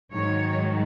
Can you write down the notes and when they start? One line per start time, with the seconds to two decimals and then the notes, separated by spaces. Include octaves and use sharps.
0.13 G#2 D#3 F#3 C#5